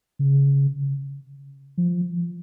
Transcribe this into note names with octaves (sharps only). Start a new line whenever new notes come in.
C#3
F3